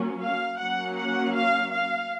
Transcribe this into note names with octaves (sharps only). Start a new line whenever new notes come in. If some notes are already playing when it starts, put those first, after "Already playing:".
Already playing: F#3 A#3 C#4
F5
F#3 A#3 C#4 F#5
F#5
F5
F5